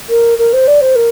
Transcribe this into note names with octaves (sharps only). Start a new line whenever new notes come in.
A#4
A#4
C5
D5
C5
A#4